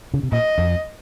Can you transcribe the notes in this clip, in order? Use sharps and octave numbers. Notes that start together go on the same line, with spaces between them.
C#3
C3
A#2 D#5
F2